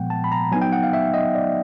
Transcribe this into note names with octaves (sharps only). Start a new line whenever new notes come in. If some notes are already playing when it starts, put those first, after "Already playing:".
Already playing: A#2 F3 G#3 B3 F#5 G5
A5
B5
A#5
F#3 B3 D#4 G#5
G5
F#5
F5
E5
D#5
D5